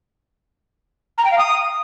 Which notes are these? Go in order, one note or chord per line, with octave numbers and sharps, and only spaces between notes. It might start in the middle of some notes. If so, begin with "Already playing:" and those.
A#5
G5
F5
D#6